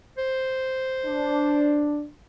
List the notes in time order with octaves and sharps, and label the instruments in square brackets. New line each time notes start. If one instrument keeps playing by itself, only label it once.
[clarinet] C5
[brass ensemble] D4